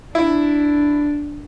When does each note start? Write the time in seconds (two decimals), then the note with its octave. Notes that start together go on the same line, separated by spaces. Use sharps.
0.15 D4 E4